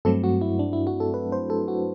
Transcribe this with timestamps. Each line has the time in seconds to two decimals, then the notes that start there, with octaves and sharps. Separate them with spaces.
0.05 G2 F#3 A3 C4 A4
0.24 F#4
0.41 E4
0.59 D4
0.73 E4
0.87 F#4
1.00 A4
1.14 B4
1.32 C5
1.50 A4
1.68 F#4